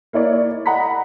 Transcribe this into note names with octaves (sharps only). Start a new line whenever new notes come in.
A#3 E4 C#5 D5
D#5 F#5 A#5 B5 B6